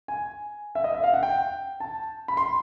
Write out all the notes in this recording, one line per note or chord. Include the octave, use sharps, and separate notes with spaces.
G#5
E5
D#5
E5
F5
F#5
G5
A5
B5
C6